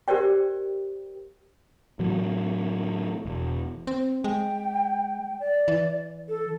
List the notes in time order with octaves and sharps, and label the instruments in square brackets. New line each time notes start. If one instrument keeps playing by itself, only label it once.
[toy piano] G4 A#4 C5 D5 G5
[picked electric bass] A2 E3 F#3
E1
[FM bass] C4
[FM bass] G#3 [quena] G5
[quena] D5
[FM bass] E3
[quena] A4